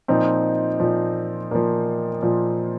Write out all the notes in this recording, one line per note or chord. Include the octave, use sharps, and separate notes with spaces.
A#2 F3 C4 D#4
A#2 F3
A#2 F3 A#3
A#2 F3